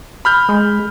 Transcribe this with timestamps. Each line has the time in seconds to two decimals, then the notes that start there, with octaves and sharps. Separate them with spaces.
0.25 B5 F6 G6
0.49 G#3